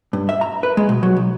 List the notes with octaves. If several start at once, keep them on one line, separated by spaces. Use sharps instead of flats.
G2
E5
A#5
B4
G#3
B2
F#3
B1